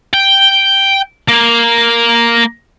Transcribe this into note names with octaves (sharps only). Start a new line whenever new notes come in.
G5
A#3